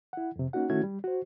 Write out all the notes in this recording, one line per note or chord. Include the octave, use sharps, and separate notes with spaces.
E4 F#5
F2 C3
A#3 C#4 D#4 F#4 F#5
D#3 A3 C#4 E4 F#4 G#6
G3
F#4 C5